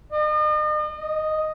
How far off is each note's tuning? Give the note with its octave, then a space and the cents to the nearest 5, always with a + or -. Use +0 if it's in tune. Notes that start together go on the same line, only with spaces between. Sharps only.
D#5 -40
D#5 +0